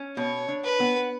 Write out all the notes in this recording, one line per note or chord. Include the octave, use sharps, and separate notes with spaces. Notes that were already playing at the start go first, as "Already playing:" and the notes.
Already playing: C#4
B2 C#5
D4
B4
B3